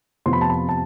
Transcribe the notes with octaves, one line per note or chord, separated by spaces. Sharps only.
F2 C3 F3 B3 C6
B5
A5
B5
A5